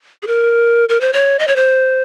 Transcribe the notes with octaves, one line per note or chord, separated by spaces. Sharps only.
G#4
A#4
A#4
C5
C#5
D#5
C#5
C5